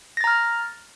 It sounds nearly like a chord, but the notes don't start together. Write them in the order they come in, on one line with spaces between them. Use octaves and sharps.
A#6 A6 A#5 F6